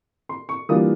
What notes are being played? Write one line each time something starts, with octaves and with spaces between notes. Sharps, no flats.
C6
C#6
E3 G3 A#3 D4 F4 D#6